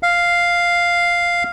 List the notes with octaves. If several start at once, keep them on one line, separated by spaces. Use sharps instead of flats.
F5